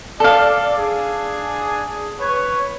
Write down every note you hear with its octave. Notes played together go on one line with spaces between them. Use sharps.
A4 D5 F5
D4 G#4
B4 C#5